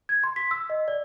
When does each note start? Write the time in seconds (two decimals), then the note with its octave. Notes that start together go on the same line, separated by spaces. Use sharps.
0.09 G#6
0.24 C6
0.36 B6
0.51 E6
0.70 D#5
0.88 D5